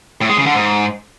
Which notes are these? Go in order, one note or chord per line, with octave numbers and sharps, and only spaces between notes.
A2
G#3
C#3
D3
G#2